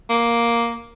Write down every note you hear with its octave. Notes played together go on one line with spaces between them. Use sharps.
A#3